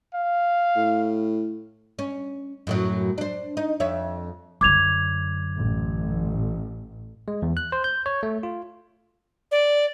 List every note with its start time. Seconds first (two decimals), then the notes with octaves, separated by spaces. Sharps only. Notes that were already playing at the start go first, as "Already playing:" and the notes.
0.14 F5
0.76 A2
1.99 C#4
2.67 F#2 A2 F#3
3.18 D4 C5
3.57 D#4
3.80 F2 C#5 E5
4.61 F#2 D3 D6 G#6 F7
5.55 A1
7.28 G#3
7.42 E2
7.57 F#6
7.72 C5
7.84 G6
8.06 C#5
8.23 A3
8.43 F4
9.52 D5